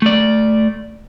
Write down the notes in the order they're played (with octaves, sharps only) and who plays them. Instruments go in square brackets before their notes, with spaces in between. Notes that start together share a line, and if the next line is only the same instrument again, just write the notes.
[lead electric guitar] A3 D5